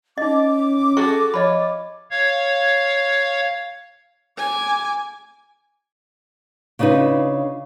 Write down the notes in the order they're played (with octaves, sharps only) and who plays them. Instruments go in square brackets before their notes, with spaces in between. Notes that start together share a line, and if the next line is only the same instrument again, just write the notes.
[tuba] C#4 [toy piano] D#4 D#5 [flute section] D6
[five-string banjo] F#4 G#4 A4 [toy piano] C#6
[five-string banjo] F3 C#5 [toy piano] D#5 B5
[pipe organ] C#5 F5 G#6
[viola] G#5 D6
[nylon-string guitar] C#3 D4 D#4 F4 B4